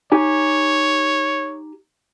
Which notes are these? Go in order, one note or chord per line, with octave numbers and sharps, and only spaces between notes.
D#4 G4 C#5 G#5